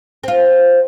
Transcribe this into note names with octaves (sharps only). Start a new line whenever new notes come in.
C4 F4